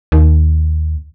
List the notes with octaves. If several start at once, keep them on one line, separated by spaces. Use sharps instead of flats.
D#2